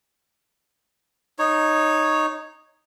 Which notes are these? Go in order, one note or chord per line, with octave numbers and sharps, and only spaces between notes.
D#4 C#5